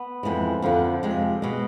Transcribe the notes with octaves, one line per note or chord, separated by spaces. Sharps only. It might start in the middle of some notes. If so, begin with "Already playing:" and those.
Already playing: B3
F2 E3 G#3
F2 D3 F3
F2 C3 G#3
B2 G#3